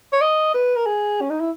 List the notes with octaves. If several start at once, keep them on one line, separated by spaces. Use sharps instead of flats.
C#5
D#5
B4
A#4
G#4
C#4
D#4
E4